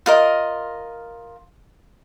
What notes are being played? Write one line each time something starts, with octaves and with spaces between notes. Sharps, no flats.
F4 A#4 D#5